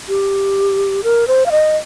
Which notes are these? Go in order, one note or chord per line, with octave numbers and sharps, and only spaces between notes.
G4
A#4
C5
F5
D#5